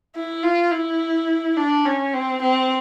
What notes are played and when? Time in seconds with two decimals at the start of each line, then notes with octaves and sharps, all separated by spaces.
0.15 E4
0.43 F4
0.71 E4
1.57 D4
1.85 C#4
2.13 C4
2.42 C4